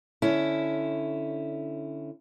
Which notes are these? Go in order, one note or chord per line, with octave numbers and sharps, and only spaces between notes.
D3 C#4 E4